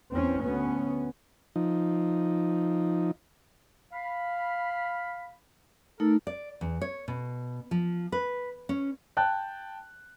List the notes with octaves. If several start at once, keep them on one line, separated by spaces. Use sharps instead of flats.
E2 C4 C#4
D2 B3 C#4
F3 D#4
F5 B5
A3 D#4 A4 A#4
D5
E2
C#5
B2
F3
B4
C#4
G5 A5 F#6